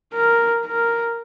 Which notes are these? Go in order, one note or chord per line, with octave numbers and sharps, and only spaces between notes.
A#4
A#4